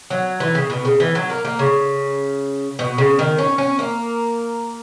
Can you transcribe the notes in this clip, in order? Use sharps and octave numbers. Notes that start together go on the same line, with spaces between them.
F#3
E3
C#3
B2
C#3
E3
F#3
A#3
A#3
C#3
B2
C#3
D#3
C#4
C#4
A#3